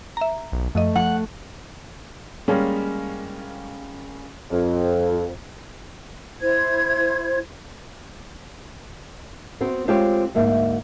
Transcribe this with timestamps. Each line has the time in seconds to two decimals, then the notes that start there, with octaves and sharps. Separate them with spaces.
0.17 E5 A#5
0.52 B1
0.75 F#2 F3 A3 D#5
0.96 F3 F#5
2.48 G3 G#3 A#3 C#4
4.51 F2
6.41 E4 C5 G#6
9.61 B3 C4 F#4
9.88 G#3 C4 F4 G4 B4 C#5
10.35 D2 G#2 A#3 E5